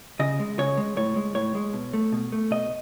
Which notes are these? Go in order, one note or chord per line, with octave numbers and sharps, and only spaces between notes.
C#3 D#5
G#3
C#3 C#5
G#3
A2 C#5
G#3
A2 C#5
G#3
B2
A3
B2
A3
B2 D#5